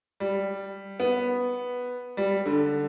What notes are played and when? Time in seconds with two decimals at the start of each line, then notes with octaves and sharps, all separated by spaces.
0.20 G3
1.00 B3
2.17 G3
2.46 D3